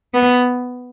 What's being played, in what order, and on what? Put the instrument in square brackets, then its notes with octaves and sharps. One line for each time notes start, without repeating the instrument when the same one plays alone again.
[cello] B3